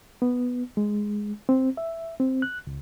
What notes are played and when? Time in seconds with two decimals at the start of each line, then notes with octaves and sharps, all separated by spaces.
0.22 B3
0.77 G#3
1.49 C4
1.77 E5
2.20 C4
2.42 F#6
2.67 C#2